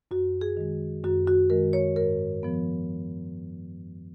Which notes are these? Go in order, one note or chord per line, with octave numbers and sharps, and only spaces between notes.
F#2 F#4
G#4
D#3 G#3
F#2 F#4
F#4
D#3 G#3 A#4
C#5
G#2 A#4
F3 B3